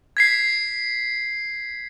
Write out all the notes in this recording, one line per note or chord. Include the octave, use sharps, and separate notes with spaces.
G#6 B6 C7